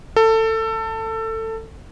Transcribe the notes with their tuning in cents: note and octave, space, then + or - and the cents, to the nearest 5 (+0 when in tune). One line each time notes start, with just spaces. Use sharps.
A4 +20